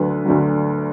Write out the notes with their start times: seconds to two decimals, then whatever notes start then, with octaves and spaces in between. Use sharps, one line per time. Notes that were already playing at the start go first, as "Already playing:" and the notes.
Already playing: D2 D3 F#3 B4
0.26 D2 D3 F#3